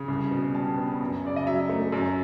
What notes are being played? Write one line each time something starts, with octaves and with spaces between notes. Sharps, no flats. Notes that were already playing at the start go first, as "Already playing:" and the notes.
Already playing: C#3
C2
B2
G3 A5
B3
F#2
C#3 D5
D#5
F#3 E5
A3
F#2